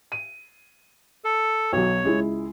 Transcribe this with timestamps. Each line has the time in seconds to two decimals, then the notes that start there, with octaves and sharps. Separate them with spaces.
0.12 D#7
1.24 A4
1.73 B1 F#3 C#5
2.04 C#2 G#3 E4